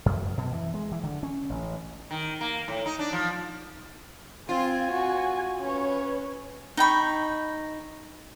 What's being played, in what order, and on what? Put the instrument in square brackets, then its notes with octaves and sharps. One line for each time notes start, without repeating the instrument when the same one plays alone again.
[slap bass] F#2
B2
E3
G#3
E3
D3
C#4
A1
[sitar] D#3
A#3
A2
D#4
D4
F3
[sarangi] C4 [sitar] F4 [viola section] G#5
[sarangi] F#4
[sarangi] C#4 [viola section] B4 C#5
[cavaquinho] D#4 G5 B5 C#6